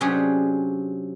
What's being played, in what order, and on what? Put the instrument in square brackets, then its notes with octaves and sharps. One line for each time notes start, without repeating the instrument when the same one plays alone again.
[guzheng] C3 F#3 C#4 D4 G4 G#4